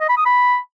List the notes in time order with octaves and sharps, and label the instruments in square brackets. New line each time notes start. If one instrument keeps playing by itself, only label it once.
[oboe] D#5
B5
D#6
B5